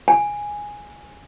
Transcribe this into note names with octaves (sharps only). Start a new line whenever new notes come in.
G#5